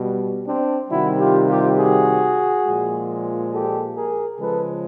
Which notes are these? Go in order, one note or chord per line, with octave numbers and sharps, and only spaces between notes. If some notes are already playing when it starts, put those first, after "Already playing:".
Already playing: B2 G3
C4 D4
C3 D#3 G3 E4 F#4
F4 G4
F4 G4
F#4 G#4
A#2 F3 G#3
G4 A4
G#4 A#4
C#3 F3 G#3 A4 B4